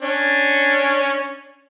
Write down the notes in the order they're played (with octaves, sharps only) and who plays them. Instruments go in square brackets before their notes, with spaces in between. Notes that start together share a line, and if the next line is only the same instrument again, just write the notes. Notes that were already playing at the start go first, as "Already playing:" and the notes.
[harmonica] C#4 D4